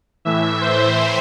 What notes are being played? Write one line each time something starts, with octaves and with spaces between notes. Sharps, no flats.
A2 E3 E5
C5